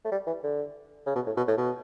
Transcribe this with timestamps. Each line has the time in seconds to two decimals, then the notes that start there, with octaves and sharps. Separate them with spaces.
0.05 A3
0.12 G3
0.27 E3
0.43 D3
1.06 C#3
1.15 B2
1.26 A2
1.37 B2
1.48 A2
1.57 B2